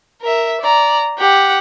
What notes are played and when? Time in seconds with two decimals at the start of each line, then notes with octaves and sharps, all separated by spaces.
0.21 A#4 E5
0.61 D5 A#5
1.18 G4 F#5